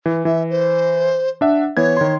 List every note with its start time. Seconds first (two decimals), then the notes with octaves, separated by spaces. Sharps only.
0.06 E3
0.25 E3 E5
0.50 C5
1.41 D4 E5 F#5
1.77 E3 B3 C#5 G#6
1.97 D#3 C6